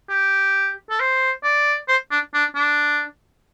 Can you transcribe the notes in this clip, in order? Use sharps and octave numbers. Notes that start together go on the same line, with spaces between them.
G4
A4
C5
D5
C5
D4
D4
D4